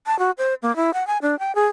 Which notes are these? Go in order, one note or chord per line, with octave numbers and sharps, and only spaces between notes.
A5
F#4
C5
A#3
E4
F#5
G#5
D4
G5
G#4